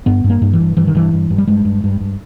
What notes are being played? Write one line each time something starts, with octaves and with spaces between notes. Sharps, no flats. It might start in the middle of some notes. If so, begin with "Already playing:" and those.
G2 B3
G2
A#3
G2
E3
G2
G2 E3
D#3
G2 E3
G2
G2
G3
G2 G#3
G2
G2
G2